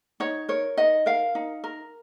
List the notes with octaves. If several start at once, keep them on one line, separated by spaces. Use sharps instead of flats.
D#4 C#5
A#4 C#5
D#4 D#5
A#4 F5
D#4
A#4